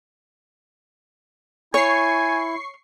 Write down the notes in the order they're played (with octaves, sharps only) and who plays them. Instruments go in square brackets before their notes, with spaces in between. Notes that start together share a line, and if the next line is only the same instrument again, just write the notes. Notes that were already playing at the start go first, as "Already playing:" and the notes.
[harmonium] E4 [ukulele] C#5 [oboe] G#5 [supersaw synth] C#6 C7